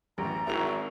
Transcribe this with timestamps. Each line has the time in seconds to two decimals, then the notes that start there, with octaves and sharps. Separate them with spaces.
0.18 A1 F#2 A#5
0.47 G#1 E4 F#4 A#4 F7